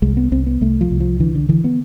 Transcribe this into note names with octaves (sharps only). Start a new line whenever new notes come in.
C2 G#3
B3
C2 C4
B3
C2 A3
F3
C2
F3
D3 E3
D3
D3 E3
B3